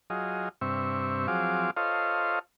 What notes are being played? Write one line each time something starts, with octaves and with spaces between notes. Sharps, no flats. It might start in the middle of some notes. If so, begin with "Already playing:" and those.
F#3 F4 G#4 D#5
G2 C3 C4 E5 C#6
F3 F#3 C4 G#4 F5 D6
F4 A4 C5 C#5 D#5 F5